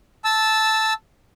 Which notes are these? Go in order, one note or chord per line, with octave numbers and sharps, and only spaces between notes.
A5 E6